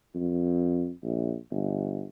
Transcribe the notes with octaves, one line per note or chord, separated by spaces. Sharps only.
F2
A#1
G1